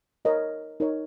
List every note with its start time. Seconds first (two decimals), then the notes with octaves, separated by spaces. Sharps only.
0.25 D#4 A#4 C#5 D#5
0.80 D#4 A#4 C#5